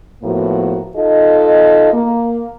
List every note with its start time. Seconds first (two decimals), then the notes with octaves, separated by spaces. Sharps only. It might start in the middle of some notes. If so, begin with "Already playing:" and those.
0.24 A2 F3 A#3 B3 F#4
0.97 D#4 F4 A4 D#5
1.94 A#3